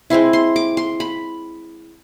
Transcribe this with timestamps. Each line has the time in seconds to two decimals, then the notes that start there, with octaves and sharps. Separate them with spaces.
0.10 G#3 C4 E4 C6
0.33 C6
0.56 D6
0.77 C6
1.00 B5